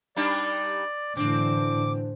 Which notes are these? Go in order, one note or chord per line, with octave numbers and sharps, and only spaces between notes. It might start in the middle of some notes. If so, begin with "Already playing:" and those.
G3 D4 D#4 D5
A2 D3 E3 C4 D4 D6